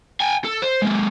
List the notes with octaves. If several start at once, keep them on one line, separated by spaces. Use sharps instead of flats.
G5 G#5
A4
C5
G#3 A#3